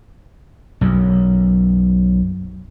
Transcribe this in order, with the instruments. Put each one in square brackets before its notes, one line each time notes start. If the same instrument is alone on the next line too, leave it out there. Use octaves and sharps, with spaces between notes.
[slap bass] B1 F#2